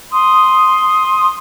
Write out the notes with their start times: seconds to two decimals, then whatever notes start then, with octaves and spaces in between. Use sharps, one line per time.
0.12 C6 D#6